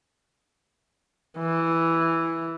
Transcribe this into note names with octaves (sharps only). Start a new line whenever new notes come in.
E3